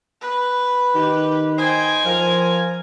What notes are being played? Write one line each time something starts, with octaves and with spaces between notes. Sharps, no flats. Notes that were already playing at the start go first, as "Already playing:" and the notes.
B4
D#3 G4
C5 D#5 G5 G#5
F3 F4 A#4